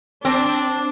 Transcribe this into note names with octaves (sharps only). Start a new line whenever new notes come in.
C4 D4